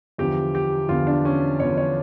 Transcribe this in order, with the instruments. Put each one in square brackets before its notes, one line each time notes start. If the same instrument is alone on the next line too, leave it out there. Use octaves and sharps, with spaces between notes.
[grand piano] E2 D3 F3 G4
G4
E2 D3 F3 F4
D4
C#4
E2 D3 F3 C#5
C#5